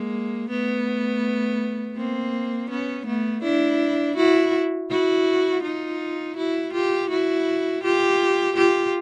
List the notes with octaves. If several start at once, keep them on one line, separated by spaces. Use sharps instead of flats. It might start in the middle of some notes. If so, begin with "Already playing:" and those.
Already playing: G#3 A#3
A3 B3
A#3 C4
B3 C#4
A3 B3
D4 E4
E4 F#4
E4 F#4
D#4 F4
E4 F#4
F4 G4
E4 F#4
F4 G4
F4 G4